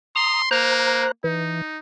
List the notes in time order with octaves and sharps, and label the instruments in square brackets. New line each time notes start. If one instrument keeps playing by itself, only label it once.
[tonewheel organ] A#5 D#6 [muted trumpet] C6
[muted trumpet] A#3 [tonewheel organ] C5 A#5 F#6
[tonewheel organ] E3 [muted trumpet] D#4